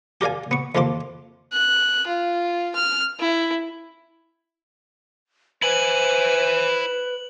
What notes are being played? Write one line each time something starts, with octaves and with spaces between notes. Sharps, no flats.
G4 A#4 D5 F5 G#5
B3 C#6
F2 C3 F3 A#3 C6 D6
F#6
F4
F6
E4
E4 B4 C5 G#5 F#7